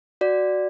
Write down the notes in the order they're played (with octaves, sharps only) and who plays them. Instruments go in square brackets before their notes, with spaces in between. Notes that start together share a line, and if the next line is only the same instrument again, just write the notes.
[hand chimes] F#4 D5